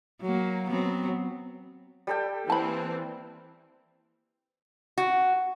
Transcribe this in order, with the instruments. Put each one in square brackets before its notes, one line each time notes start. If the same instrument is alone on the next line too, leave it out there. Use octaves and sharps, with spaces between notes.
[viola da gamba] F#3 A#3
F#3 B3 C4
[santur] G3 A4 G5
[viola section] E3 A#3 C4 [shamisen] A5 B5
[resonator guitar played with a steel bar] F#4